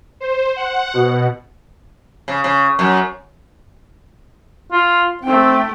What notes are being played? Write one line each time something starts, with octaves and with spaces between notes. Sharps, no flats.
C5
F#5
B2
C#3
C#3
F#2
F4
A3 C4 G5